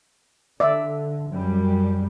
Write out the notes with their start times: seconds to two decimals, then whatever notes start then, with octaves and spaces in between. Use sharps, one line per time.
0.60 D3 D5 E5
1.30 F#2 G3